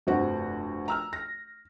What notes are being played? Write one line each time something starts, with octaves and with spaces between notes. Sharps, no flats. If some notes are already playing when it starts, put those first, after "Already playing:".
F1 G2 C4 F#4
A#5 E6 F6
A#6